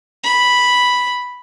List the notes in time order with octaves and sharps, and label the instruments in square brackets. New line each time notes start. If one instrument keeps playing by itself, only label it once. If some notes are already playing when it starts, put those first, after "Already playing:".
[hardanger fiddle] B5